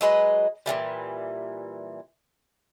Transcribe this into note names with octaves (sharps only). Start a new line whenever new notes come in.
F#3 G#3 B4 D#5
A#2 C#3 E3 G3